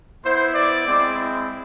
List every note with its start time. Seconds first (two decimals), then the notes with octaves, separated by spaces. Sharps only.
0.24 B3 E4 C5
0.55 D5
0.86 G#3 C4 E4